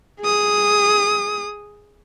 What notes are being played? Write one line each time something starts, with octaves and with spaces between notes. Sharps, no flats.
G#4 D#6